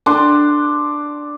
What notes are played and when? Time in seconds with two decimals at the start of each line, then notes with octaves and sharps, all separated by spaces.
0.06 D4 C6